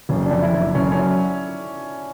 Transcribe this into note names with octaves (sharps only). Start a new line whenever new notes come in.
F#1 C#4
D4
F2
E4
F#1
F#1 C#4
C#4
F#3